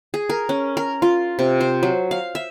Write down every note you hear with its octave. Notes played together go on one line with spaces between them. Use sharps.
G#4
A#4
C#4
A#4
F4
C3
C5
F#3
F5
E5